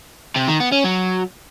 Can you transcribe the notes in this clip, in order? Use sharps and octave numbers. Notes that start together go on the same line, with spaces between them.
C3
D#3
B3
C#4
F#3